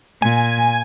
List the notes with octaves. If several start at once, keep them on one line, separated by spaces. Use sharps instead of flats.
A#2 G#5